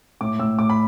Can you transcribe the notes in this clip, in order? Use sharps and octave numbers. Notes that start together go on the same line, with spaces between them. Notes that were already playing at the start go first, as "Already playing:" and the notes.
A2 D6
A2 E6
A2 D6
B5